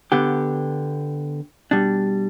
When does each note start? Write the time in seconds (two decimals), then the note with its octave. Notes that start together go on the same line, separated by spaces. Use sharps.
0.12 D3 B3 G4
1.71 B2 G3 D4